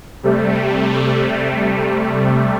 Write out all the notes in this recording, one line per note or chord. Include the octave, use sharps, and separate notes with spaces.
C3 G3 A3